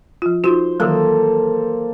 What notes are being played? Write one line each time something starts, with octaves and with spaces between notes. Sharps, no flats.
F3 F4
D#4 F4 F#4 C5
D#3 E3 F#3 A#3 A4